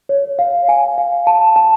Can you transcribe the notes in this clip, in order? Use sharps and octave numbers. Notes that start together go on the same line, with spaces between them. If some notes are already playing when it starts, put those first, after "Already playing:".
C#5
F5
G#5
F5
A5
A5